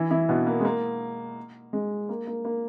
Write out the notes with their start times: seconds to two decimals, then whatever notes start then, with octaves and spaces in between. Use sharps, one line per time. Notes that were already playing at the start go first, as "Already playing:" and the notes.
Already playing: E3 E4
0.11 E3 E4
0.29 B2 B3
0.47 A#3
0.60 G#3
0.65 A#3
1.73 G#3
2.09 A#3
2.27 A#3
2.45 A#3